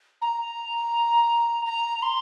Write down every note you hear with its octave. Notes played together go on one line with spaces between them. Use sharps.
A#5
A#5
C6